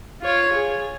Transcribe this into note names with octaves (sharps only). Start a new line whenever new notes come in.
F4 C#5
G#4